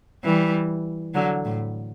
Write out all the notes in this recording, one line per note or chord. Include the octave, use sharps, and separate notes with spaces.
E3 G3
D3 F#3
A2